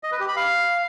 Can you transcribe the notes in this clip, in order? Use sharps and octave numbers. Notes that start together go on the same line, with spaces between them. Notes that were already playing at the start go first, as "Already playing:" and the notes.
D#5
B4
G4
B5
F5